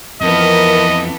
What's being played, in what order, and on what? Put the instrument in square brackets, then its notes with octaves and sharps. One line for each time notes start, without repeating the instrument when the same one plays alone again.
[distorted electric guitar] F2 [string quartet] E3 B3 A4 [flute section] A#4 [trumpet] D#5